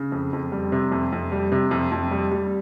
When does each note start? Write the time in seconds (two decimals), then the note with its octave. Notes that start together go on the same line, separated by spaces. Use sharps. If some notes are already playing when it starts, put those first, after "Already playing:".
Already playing: C#3
0.12 F2
0.33 F2
0.52 G3
0.72 C3
0.91 F2
1.12 F2
1.32 G3
1.52 C3
1.71 F2
1.91 F2
2.11 G3
2.31 G3